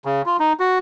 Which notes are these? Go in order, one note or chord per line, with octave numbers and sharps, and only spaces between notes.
C#3
F4
D#4
F#4